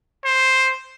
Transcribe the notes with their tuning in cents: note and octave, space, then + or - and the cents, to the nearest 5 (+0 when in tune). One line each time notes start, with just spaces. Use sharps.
C5 +5